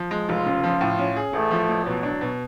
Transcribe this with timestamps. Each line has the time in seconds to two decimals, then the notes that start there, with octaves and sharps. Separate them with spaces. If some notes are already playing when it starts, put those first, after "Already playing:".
Already playing: F3
0.11 G#3
0.28 F1 F4
0.46 C#3
0.64 F3
0.81 A2
0.98 C#4
1.16 G#4
1.33 A1 A3
1.51 F3
1.69 A1
1.86 B2 F#3
2.03 D4
2.21 B2